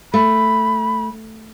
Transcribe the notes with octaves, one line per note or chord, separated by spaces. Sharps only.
A3 B5